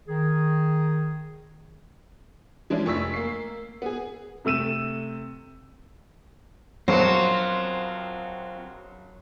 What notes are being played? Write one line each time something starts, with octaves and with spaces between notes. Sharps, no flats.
D#3 G#4
E3 F3 G#3 C#4 D4 E4
F1 C#6 E6 B6
A#3 C7
B3 G#4
C3 A3 E6 D#7 E7
A#1 F#2 F#3 B3 C4 F4 F#4 C5